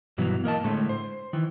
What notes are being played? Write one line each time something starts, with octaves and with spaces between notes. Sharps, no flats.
G2 B2 E3 F#3
A#3 A#4 D#5 A5
A2 D3 G#3 A3
C5
D#3 E3